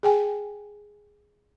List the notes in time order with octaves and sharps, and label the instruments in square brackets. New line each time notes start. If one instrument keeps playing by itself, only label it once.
[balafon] G#4 G5 G#5